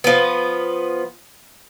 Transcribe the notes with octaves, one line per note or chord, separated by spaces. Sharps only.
F3 B3